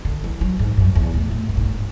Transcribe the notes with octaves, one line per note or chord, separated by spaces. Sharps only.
D3
E3
F#3
G#2
F#2
E2
A2
A2
G#2
A2
G#2